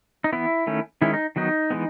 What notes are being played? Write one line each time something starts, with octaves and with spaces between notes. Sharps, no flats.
D#4
E3 B3 E4
D#3 A3 C#4
D#3 G#3 C#4 E4
D#4
D#3 F#3 B3 D#4
E3 G#3 B3